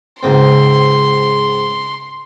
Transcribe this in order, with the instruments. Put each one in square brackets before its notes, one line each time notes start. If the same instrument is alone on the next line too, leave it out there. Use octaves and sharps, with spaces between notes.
[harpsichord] C#2 G#2 C4 [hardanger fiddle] C6